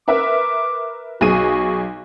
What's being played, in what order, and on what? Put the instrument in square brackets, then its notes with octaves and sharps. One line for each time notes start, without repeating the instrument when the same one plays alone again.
[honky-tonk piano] A#4 B4 E5 [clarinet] D6
[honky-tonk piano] B1 G#4 D#7 [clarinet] F#4